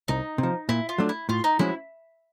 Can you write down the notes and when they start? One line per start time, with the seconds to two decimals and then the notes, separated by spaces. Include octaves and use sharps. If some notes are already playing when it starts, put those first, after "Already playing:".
0.08 C2 D#4
0.38 C3
0.43 F3
0.69 A#2 E4
0.89 F4
0.98 F#3 A3 D4
1.09 E4
1.29 A2 F4
1.44 D#4
1.59 F3 G#3 C#4 E4 F#4